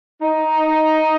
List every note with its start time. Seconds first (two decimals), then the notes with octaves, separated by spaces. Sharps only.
0.22 D#4